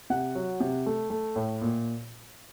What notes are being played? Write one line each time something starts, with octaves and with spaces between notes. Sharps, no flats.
C3 F#5
F#3
C3
A3
A3
A2
A#2